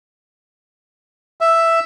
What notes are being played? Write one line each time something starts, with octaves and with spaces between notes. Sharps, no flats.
E5